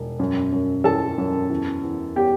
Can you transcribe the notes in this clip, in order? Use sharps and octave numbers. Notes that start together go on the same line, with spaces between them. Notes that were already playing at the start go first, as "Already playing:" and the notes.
Already playing: E1
F#2
F#2
E3 A4 A5
F#2
E2
E2
B3 G4 G5